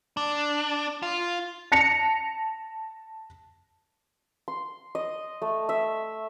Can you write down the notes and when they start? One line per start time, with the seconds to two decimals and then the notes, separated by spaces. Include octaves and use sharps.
0.17 D4
1.03 F4
1.72 A5 A#6 C#7 F7
4.48 C6
4.95 D#5
5.42 A3
5.69 E5